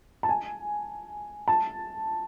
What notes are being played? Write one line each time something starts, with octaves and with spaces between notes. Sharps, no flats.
A5
G#5
A5